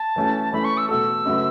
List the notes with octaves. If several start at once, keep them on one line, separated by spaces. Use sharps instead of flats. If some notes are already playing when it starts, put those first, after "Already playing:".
Already playing: A5
E3 A3 C#4 F#4
E3 A3 C#4 B5
C#6
E6
B2 A3 F#4 A4 E6
F#2 C#3 A3 F#4 B4